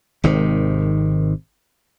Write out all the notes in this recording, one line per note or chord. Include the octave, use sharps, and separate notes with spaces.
G#1 C3 D#3